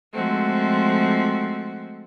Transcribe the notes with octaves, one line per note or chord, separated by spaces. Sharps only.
F3 G#3 A3 C4 F#4